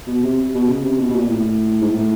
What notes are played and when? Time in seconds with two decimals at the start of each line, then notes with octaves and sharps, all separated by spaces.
0.07 B2
0.23 C3
0.54 B2
0.68 C#3
0.84 C3
0.99 B2
1.10 B2
1.15 A#2
1.30 A2
1.81 G#2
1.90 A2